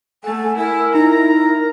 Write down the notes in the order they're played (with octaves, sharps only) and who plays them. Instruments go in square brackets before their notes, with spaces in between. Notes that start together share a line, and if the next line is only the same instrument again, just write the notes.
[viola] A3 [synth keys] F#5 A6 [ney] G#5
[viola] E4 [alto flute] A#4 [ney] G#5
[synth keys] D#4 [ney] E4 [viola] A#5
[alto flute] A#4